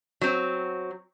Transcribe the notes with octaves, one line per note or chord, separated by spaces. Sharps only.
F#3 C4